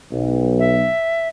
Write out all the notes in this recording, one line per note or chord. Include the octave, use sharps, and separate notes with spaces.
B1
E5